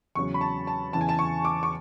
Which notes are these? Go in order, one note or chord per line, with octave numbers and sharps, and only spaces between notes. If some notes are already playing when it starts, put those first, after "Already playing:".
E2 C#3 F#3 C#6
B5
A5
A5
E2 C#3 E3 A5
G#5
A5
C#6
D6
C#6